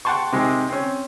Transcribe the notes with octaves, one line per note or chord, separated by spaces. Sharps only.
F#5 G5 A5 C6 C#6
C3 D#3 G#3 C4
C4 C#4